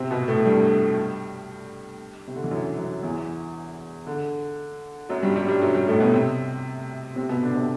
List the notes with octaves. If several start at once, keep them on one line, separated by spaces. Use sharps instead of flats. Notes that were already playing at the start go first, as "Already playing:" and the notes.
Already playing: C3 C4
B2 B3
A2 A3
G2 G3
C3
D3
E3
F#2 F#3
F#2 F#3
E2 E3
D3
F#2 F#3
G2 G3
G2 G3
G2 G3
F#2 F#3
G2 G3
A2 A3
B2 B3
C3 C4
C3 C4
B2 B3
D3 D4
C3 C4